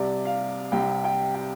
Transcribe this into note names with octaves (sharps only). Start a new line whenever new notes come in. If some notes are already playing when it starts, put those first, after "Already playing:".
Already playing: C2 C3 D5
F5
C2 C3 G5
G5
G5